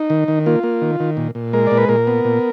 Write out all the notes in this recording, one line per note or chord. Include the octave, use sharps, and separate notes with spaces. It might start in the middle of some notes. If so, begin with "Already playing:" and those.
Already playing: D#4
D#3
D#3
A#3 F4
A#3
D#3
D#3
A#2
A#2
G#3 A#4
A#2 D5
B4
A#2 A#4
B3
A#2